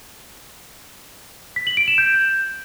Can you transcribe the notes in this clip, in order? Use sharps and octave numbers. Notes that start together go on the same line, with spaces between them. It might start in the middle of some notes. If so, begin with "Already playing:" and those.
B6
F#7
D7
E7
G6